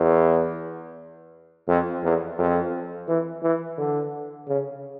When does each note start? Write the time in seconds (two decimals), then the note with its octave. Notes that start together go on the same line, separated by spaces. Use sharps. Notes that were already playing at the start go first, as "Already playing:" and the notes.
Already playing: E2
1.68 F2
2.03 E2
2.38 F2
3.08 E3
3.42 E3
3.78 D3
4.47 C#3